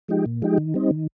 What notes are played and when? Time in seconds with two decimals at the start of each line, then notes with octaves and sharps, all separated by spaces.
0.08 F3 G#3 D#4 G4
0.26 A#2
0.42 F3 G#3 D#4 G4
0.58 D#3
0.74 G3 C4 D#4
0.91 D#3